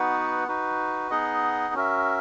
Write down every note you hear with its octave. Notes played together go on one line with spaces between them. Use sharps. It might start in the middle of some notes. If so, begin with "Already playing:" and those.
Already playing: B3 D#4 F#4 B4 F#5
D#4 F#4 B4
B3 D#4 G#4 D#5 F#5
C#4 F#4 A#4 E5